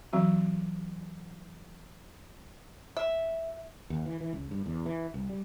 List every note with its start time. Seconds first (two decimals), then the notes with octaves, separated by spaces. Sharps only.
0.13 E3 F#3 C4 F#4
2.97 E5
3.90 D#2
4.06 E3
4.21 E3
4.33 C#2
4.51 G2
4.66 E2
4.86 E3
5.14 C2
5.29 G3